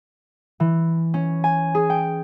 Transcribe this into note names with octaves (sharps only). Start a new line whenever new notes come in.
E3
C#4
G#5
G#4
G5